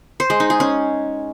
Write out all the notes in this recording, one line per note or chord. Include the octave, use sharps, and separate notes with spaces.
C5
G#3
D#4
G#4
C#4